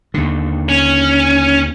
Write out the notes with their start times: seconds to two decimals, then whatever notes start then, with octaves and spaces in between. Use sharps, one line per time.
0.14 D#2 D3
0.69 C#4